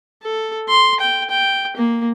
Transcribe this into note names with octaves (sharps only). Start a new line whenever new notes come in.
A4
C6
G5
G5
A#3